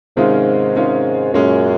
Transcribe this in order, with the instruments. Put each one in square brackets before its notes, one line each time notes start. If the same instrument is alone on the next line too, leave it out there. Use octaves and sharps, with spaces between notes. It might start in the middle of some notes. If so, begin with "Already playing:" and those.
[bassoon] G#2 [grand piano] C3 D#3 G#3 C#4 F4
[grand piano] C3 D#3 G#3 C#4 F4
[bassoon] F#2 [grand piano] A#2 G#3 C#4 G#4